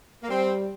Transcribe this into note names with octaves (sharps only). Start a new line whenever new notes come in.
A#3
G3 C4